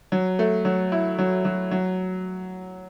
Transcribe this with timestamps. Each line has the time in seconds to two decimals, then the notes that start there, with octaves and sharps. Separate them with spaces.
0.12 F#3
0.39 A3
0.65 F#3
0.92 E4
1.18 F#3
1.45 F#3
1.71 F#3